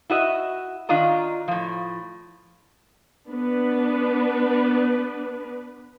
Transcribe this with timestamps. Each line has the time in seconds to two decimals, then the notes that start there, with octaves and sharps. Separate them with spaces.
0.10 E4 F#4 D#5 E5
0.89 D#3 D4 F4 D#5 A#5
1.48 A2 F3
3.30 B3 D4 B4